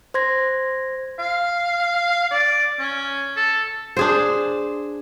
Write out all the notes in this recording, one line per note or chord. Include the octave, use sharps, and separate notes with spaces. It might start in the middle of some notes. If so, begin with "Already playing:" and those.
C5 C6 G#6 A#6
F5
D5
C#4
A4
D4 G#4 C5